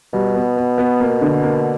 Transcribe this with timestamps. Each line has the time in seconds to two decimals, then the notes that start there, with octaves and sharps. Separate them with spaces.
0.13 B2 G3
0.35 B3
0.56 B3
0.78 B3
1.00 A#3
1.22 D3
1.43 A#3